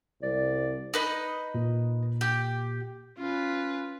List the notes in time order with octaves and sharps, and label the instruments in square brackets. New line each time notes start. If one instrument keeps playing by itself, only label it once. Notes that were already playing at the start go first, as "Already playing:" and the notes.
[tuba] C2 [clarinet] D5
[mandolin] D#4 B4 D#5
[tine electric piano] A#2
[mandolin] G4
[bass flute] C#4 [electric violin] F4 B4